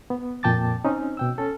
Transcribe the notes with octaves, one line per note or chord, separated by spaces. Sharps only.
B3
F2 A#2 G5 A5 D6 A6
C4 C#4 D#4
B2 G5 E6
C#4 A4